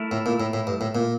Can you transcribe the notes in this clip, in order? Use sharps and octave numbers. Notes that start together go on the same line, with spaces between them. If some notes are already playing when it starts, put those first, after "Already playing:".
Already playing: A3 E4 A#4
A2
A#2
A2
A2
G2
A2
A#2